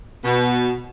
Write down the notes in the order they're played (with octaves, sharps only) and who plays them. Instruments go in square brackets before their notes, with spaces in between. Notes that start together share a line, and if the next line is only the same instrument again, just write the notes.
[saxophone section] B2